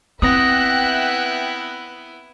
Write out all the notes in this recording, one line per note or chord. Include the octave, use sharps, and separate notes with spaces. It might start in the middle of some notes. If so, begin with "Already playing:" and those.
B3 C4 E4 E5 G5 D#6 F#6 A#6